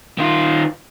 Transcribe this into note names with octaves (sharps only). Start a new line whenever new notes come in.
D#3 F4